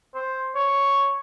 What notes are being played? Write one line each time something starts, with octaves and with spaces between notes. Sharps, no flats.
C5
C#5